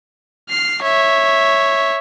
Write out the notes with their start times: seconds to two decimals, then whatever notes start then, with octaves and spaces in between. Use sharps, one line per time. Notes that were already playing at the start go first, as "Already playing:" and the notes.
0.49 F6 C7
0.82 C#5 E5